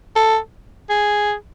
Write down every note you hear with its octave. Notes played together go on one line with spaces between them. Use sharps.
A4
G#4